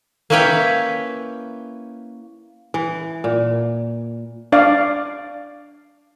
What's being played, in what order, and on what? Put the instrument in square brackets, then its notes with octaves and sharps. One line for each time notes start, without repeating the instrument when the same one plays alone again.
[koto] A#3 C#4 E4 B4 C#5 G5
[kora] E3
A#2
[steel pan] D4 D5 F5